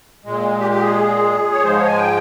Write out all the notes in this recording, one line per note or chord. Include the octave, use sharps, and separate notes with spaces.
A#2 G#3
G4
G4
G#4
C#5
G#2 F3 G#3 C5
C#5
G#5
G5